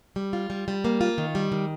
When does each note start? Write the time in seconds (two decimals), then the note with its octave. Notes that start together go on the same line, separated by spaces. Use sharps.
0.16 G3
0.33 F4
0.50 G3
0.68 G3
0.85 A#3
1.01 F4
1.18 D#3
1.35 G3
1.52 D#3